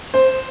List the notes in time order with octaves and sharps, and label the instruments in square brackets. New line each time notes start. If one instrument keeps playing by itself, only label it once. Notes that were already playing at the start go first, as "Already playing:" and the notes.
[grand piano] C5